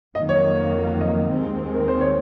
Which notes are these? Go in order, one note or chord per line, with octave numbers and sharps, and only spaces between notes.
F2 D#3 F#3 A#3 D#5
C#5
D#5
D#2 D#3 G#3 C4
A#4
C5
C#5